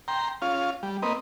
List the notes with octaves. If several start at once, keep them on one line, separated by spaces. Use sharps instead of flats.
G5 A#5 C6
C#4 F4 F5
G3
A#3 C4 B4 D#5